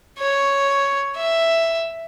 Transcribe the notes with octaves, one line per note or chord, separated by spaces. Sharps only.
C#5
E5